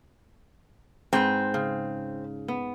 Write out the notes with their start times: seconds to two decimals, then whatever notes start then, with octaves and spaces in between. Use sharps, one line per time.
1.13 G#2 C4 B4
1.54 C#3
2.48 B3